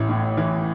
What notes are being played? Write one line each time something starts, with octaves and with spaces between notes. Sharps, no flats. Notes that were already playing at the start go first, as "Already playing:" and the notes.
Already playing: A1 E4
A2
E3